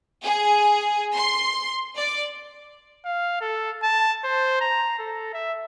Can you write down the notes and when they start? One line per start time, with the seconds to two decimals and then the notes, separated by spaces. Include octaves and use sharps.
0.24 G#4
1.14 C6
1.97 D5
3.05 F5
3.41 A4
3.83 A5
4.24 C5
4.61 A#5
4.99 A4
5.34 E5